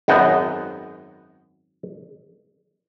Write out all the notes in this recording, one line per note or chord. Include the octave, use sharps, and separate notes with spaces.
G#1 F#2 B3 D#5 G5